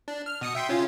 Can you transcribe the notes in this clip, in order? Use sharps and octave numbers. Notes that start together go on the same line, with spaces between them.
D4
F6
B2 D#6 C#7
E5 G5 C6
C#3 C#4 F4